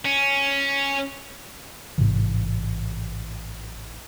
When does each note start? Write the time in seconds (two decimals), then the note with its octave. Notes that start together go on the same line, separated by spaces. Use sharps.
0.06 C#4
1.98 A1 G#2 C3 E3